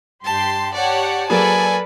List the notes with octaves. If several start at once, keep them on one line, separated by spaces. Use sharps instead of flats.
G2 G4 A5 C6
G4 C#5 D5 F#5 A5
F#3 A#3 G#4 A4 B4 D5 G#5 A5